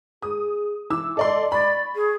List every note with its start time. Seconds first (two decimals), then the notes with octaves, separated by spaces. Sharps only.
0.22 G#4 D#6
0.90 E3 D6 E6
1.17 A4 D5 D#5 C6
1.52 D5 B5 C#6
1.95 G#4